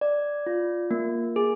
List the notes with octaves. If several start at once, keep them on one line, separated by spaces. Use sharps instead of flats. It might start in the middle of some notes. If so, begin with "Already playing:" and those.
D5
F4
A#3
G#4